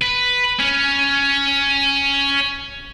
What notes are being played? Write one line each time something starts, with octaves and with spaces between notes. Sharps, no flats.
B4
C#4